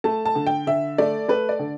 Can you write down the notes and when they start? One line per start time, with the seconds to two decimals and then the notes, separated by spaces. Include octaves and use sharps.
0.04 A3 A5
0.25 A5
0.35 D3
0.47 G5
0.67 D3 E5
0.98 A3 D5
1.29 A3 B4
1.49 D5
1.59 D3